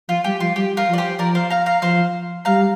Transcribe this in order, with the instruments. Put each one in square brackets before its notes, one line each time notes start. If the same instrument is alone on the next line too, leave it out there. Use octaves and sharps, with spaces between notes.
[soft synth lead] F3 [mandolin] F4
[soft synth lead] G3 [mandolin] G4
[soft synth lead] F3 [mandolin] F4
[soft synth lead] G3 [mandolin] G4
[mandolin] F4 A#4
[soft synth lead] F3
[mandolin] D5
G4 C5
[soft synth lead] F3 [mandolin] A#4 D5
[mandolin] C5 F5
F5 A#5
F5 A#5
[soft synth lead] F3 [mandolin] C5 F5
[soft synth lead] G3 [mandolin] F5 A#5